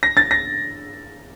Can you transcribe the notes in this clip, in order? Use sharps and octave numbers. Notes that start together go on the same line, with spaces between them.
A#6
A6
A#6